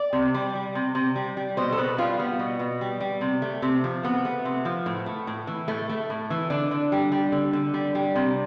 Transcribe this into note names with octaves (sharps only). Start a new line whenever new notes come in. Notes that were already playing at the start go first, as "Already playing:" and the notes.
Already playing: D5
C3
G3
G3
C3
C3
G3
G3
B2 C5
A4
B2 B4
G3 F4
G3 B3
B2
B2
G3
G3
C3
A3
C3
F3
C3 B3
A3
C3
F3
A2
A3
A2
E3
A2 A3
A3
A2
E3
D3 D4
D3
G3
G3
D3
D3
G3
G3
C3